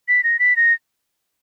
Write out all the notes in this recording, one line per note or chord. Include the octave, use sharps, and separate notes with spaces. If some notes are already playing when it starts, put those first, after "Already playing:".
B6
A#6
B6
A#6